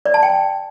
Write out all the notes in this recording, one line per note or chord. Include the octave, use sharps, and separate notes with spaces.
D5
A5
G5